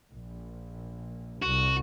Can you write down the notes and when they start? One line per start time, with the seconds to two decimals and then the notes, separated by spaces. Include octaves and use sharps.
0.12 A#1
1.42 C2 F#4